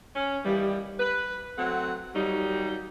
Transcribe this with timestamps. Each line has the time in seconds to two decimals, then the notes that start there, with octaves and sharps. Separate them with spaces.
0.15 C#4
0.45 D#2 E3 G3
0.99 B4
1.58 F#3 A3 C4 F#5
2.14 D#2 F#3 G3 D#4